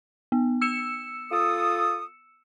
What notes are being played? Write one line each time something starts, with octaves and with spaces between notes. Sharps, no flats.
B3
E6 C#7 E7
F4 A4 D#6